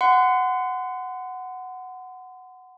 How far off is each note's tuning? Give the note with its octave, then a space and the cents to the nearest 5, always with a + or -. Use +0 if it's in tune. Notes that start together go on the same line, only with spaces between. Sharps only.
F#5 +0 C6 -40